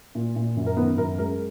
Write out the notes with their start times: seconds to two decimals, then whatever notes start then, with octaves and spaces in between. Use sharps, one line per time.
0.15 A#2
0.36 A#2
0.57 F#2
0.66 A#4
0.77 D#3 B3 B4
0.97 F#2 A#4
1.18 G#3 A#4